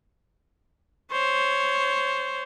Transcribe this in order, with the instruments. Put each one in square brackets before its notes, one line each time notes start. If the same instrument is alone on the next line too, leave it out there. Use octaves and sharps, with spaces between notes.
[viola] C5 C#5